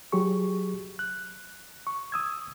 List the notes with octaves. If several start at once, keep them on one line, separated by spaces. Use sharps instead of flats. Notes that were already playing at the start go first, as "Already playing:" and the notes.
F#3 G4 G#4 C#6
F#6
C#6
D#6 E6 G#6